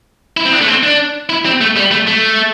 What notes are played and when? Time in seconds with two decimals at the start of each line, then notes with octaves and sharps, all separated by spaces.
0.37 E4
0.46 C4
0.52 D4
0.61 A3
0.68 C4
0.83 D4
1.29 E4
1.45 C4
1.61 A3
1.76 G3
1.91 A3
2.07 A3